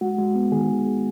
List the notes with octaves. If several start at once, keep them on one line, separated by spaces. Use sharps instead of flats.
G#3 F#4
G#3
B3
D#3 G#4